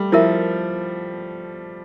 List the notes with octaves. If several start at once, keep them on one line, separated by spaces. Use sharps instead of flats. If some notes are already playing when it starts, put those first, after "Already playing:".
Already playing: G3 A3
F3 E4 A#4 E5